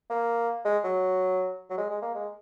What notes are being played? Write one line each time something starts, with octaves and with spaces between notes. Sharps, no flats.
A#3
G#3
F#3
F#3
G#3
G#3
A#3
G#3